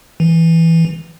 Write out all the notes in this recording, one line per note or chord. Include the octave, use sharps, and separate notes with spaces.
E3